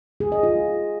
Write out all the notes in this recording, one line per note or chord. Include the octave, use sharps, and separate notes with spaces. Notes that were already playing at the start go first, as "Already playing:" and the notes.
G#4
D#5
F4